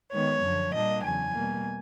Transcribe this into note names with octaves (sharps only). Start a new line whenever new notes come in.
D#3 G#3 B3 C#5
F#2 D3 F3
A#2 G3 A#3 D4 D#5
E2 C#3 F#3 G#5
B2 G3 A#3